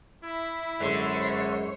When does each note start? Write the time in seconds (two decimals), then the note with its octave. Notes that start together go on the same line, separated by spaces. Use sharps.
0.24 E4
0.80 F#2 D3 G#3 C5 C#5